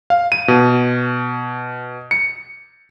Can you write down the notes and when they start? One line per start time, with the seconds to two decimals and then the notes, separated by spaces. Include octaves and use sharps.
0.10 F5
0.32 D#7
0.48 B2
2.11 C#7